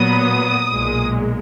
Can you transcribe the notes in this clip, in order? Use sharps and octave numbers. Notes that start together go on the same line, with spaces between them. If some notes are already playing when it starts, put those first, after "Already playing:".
Already playing: A#2 F#3 B3 D#6
B1 A#2 G#3